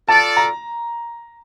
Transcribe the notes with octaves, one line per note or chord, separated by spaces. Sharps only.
F4 A4 D5 A5
A#5